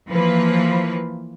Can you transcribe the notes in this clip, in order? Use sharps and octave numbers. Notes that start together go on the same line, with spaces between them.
E3 F3 A#3 B4